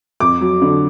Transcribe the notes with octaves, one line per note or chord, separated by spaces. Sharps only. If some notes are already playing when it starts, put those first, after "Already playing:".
F2 D6
F#3
D3